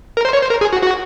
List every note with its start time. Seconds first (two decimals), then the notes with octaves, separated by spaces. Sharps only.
0.17 A#4
0.25 C5
0.33 C#5
0.42 C5
0.50 A#4
0.61 G#4
0.73 F#4
0.83 F#4